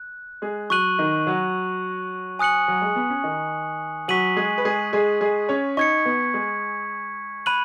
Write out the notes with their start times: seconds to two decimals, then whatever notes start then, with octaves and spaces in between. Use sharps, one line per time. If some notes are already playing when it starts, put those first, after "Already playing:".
Already playing: F#6
0.42 G#3 G#4
0.70 F#3 F#4 C#6 F#6 D#7 F#7
0.98 D#3 D#4
1.27 F#3 F#4
2.39 G#5 D#6 F#6 C#7 F#7
2.68 F#3
2.82 G#3
2.96 B3
3.10 C#4
3.24 D#3 D#4
4.08 F#3 F#4 C#6 B6 D#7 F#7
4.37 G#3 G#4
4.58 B4
4.65 G#3 G#4
4.93 G#3 G#4
5.21 G#3 G#4
5.49 C#4 C#5
5.77 D#4 D#5 C#6 G#6 C#7
6.05 B3 B4
6.34 G#3 G#4
7.46 B5 F#6 D#7 F#7